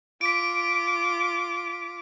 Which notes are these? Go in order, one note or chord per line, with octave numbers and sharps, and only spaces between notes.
F4 D6 B6 D7